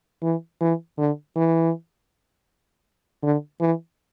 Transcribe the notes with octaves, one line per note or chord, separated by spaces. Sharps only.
E3
E3
D3
E3
D3
E3